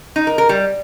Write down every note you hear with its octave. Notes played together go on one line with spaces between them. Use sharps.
D#4
A#4
A#4
G3